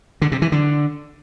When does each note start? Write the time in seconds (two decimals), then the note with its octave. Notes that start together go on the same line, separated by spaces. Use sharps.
0.22 D3
0.32 C3
0.42 E3
0.52 D3